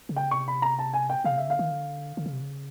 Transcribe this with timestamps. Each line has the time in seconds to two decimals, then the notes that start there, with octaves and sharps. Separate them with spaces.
0.09 C#3
0.16 G5
0.31 C3 C#6
0.48 B5
0.62 A#5
0.79 A5
0.93 G#5
1.10 G5
1.24 C#3 F5
1.31 C3
1.37 C#3 E5
1.48 D3 F5
1.59 D#3
1.71 D3
2.17 D3
2.26 C#3
2.33 C3
2.41 C#3